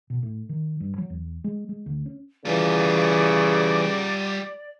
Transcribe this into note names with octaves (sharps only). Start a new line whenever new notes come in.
B2
A2
D#3
G2
F#3
E2
G#3
G#3
D2
C#4
C#3 E3 G3 F4 D5